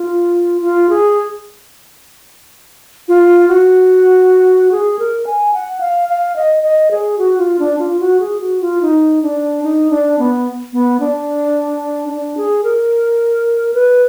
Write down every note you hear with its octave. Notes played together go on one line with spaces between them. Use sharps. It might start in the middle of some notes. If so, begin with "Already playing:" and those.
Already playing: F4
F4
G#4
F4
F#4
G#4
A#4
G#5
F#5
F5
F5
D#5
D#5
G#4
F#4
F4
D4
F4
F#4
G#4
F#4
F4
D#4
D4
D#4
D4
B3
B3
D4
D4
G#4
A#4
B4